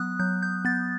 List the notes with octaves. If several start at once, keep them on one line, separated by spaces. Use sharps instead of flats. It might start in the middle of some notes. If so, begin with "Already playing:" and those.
Already playing: F#3 B3 D#6 F#6
F#3 G6
G6
B3 A6